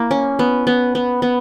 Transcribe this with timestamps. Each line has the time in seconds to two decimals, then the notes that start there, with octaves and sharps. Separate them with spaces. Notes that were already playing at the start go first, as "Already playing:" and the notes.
Already playing: A#3 E4
0.11 C#4
0.39 B3
0.67 B3
0.95 B3
1.22 B3